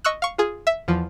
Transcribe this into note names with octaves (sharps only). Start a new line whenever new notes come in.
D#5 C#6 E6 F#6
F5 C#6
F4 G#4
E5
E2 F3